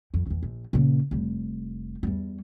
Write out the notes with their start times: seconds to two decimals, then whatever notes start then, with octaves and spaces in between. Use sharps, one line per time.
0.14 F2
0.26 A#1 E2
0.42 A#1
0.73 A#2 C#3
1.11 F1 G3
2.03 E2 G3